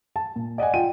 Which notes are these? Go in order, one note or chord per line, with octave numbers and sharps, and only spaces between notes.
A5
A#2
D5 D#5 F#5 G#5
F4 G5 D#7